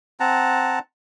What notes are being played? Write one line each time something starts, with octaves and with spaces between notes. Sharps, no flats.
C4 F#5 A5 A#5